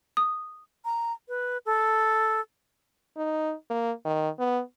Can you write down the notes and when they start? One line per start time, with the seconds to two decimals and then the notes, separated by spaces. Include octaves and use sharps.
0.17 D#6
0.85 A#5
1.28 B4
1.66 A4
3.17 D#4
3.70 A#3
4.05 D#3
4.39 B3